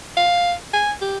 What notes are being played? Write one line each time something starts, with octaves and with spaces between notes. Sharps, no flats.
F5
G#5
G4